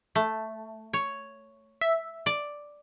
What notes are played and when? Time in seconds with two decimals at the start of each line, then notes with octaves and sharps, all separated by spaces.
0.15 A3
0.93 C#5
1.81 E5
2.26 D5